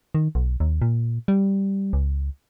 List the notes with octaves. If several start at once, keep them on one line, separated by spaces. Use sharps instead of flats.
D#3
B1
D#2
A#2
G3
C#2